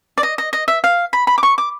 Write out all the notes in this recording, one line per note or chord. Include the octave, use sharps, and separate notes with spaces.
D5
D#5
D#5
D#5
E5
F5
B5
B5
D6
C#6
D6